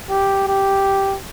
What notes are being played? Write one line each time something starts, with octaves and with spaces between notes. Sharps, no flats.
G4
G4